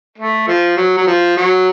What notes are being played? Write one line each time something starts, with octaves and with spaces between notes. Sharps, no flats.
A3
F3
F#3
F#3
F3
F#3